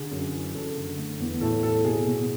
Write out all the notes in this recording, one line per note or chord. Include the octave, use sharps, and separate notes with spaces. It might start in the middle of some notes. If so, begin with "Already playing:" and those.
Already playing: D3 G#4
F#2
E3
F#2 A4
D3
A3
E2
A2 A4
A2 A4
B2 G#4
B2